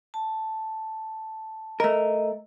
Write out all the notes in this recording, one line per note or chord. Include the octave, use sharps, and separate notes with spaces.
A5
A3 A#4 D#5